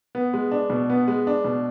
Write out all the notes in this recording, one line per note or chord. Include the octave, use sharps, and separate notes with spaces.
B3
G#3
D4
B2
B3
G#3
D4
B2